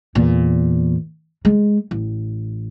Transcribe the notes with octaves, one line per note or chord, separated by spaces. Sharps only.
E2 A#2
G#3
A1